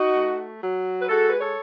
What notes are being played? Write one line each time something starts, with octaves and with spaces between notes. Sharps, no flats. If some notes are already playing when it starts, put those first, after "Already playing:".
Already playing: D#4 F#4
A3
F#3
B4
G#3 F#4 A4
B4
A4 C#5